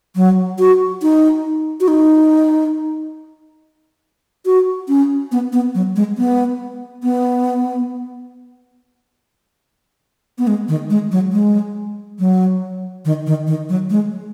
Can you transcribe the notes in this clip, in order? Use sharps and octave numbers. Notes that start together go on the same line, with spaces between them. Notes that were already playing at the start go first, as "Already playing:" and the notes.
F#3
F#4
D#4
F#4
D#4
F#4
C#4
B3
B3
F#3
G#3
B3
B3
B3
G#3
D#3
G#3
F#3
G#3
F#3
D#3
D#3
D#3
F#3
G#3